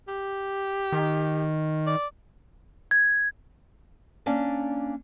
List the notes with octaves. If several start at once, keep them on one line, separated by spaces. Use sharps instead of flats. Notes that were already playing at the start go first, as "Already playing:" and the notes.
G4
D#3
D5
G#6
A#3 C#4 D4 D5